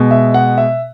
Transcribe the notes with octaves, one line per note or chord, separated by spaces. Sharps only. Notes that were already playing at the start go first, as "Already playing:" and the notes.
Already playing: B2 G#3
E5
F#5
E5